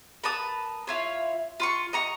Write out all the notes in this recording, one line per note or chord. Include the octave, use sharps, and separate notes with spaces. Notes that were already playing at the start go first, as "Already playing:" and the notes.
A#4 B4 A5 D#6
E4 F4 C#5
F4 C6 C#6
D#5 A#5 C#6